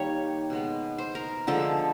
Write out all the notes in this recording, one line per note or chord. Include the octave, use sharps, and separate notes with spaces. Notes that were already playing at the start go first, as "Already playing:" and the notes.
Already playing: D#3 G3 A#3 C#5
B2 G#3 B3
C5
A#4
D3 F3 G#3 A4